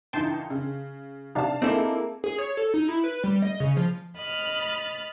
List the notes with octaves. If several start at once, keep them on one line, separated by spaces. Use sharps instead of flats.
C#2 E3 D#4 G5 A5 C6
C#3
C3 D4 D#4 F5 A5
G#3 A#3 C4 D#4 E4 A4
G#4
C#5
A4
D#4
E4
B4
G3
D#5
C#3
F3
D#5 B5 F6 A6